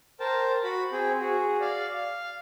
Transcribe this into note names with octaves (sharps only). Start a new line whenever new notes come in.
A#4 C5 G5 A5
F#4 B5
C4 G#4 G5
F#4 G#4
D5 F5
F5